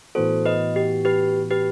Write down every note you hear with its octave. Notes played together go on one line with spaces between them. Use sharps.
A2 E3 B3 F#4 A4 C5
B4 D#5
G4
G4 B4
G4 B4